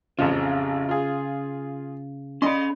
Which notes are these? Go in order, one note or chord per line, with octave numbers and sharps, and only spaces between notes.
A1 F2 C#3 F4
F4 G#4
C#4 D5 D#5 B5 C6